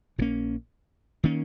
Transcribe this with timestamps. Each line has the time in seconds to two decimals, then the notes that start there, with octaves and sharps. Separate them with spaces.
0.18 A#1 A#2
0.21 A#3 C#4
1.23 D#3 A#3 C#4